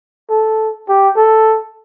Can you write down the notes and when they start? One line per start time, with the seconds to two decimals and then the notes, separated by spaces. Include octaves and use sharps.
0.30 A4
0.89 G4
1.16 A4